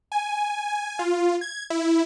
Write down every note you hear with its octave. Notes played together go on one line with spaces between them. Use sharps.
G#5
G#5
F4
G#6
E4